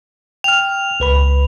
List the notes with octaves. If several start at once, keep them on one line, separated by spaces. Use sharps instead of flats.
G5 F6 F7
C#2 B4 B5